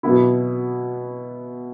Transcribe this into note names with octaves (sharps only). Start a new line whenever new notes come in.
B2 F#3 B3 E4